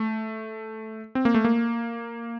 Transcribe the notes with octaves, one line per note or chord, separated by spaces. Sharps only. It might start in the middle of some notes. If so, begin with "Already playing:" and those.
Already playing: A3
C4
A#3
A3
A#3